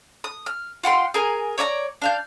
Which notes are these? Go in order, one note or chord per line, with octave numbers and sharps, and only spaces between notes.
D#6
F6
F4 F#5 G5 C6
G#4 A#4 G#5
C#5 D5 E5 A#5
D4 F5 G6